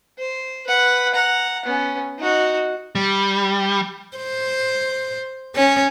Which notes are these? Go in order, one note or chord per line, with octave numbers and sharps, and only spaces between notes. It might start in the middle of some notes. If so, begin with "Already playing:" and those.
C5
B4 F#5
F#5 A#5
B3 C#4
D#4 F#4
G3
C5
C#4